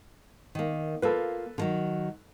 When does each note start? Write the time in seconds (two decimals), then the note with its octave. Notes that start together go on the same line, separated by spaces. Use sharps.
0.55 D#3 A#3
1.02 A#3 F4 A4 B4
1.58 D3 D#3 F#3